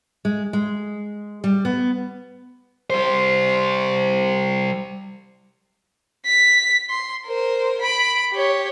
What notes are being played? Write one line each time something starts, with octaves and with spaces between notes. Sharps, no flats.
G#3
G#3
G3
B3
G3 C5
B6
C6
A#4 C5
B5 D7
G4 C#5